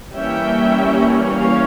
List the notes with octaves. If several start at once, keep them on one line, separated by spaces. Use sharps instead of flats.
E3 G3 A#3 C#4 E5 G5
C#5 F5